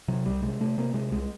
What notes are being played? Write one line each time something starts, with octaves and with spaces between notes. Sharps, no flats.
C3 F#3
C2 G3
C3 G#3
C3 A3
C3 A#3
C3 G#3
C2 G#3